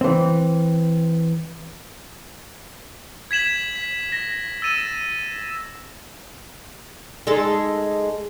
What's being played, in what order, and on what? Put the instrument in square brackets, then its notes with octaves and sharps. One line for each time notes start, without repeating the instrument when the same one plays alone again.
[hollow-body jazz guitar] E3 C4
[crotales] G#6 B6 E7 F#7
B6
A#6
E6 A6 D#7 E7
[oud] G#3 D#4 A4